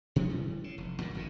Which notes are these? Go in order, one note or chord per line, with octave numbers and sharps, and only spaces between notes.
B2 F3 G#3 C#4
E3 G3
C#3
F1
D#2 A2 F#3
G#1 A#2 D3